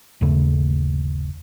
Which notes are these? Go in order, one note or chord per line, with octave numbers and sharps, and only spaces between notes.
G1 D#2 C#3 A3